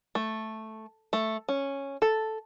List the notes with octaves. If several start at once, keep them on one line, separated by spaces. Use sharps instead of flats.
A3
A3
C#4
A4